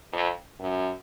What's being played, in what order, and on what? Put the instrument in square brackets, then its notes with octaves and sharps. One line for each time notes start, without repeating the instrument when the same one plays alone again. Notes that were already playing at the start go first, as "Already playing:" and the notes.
[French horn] F2
F#2